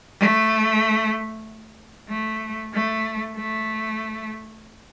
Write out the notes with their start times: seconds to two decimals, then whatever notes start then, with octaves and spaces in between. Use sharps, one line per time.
0.20 A3
2.09 A3
2.74 A3
3.36 A3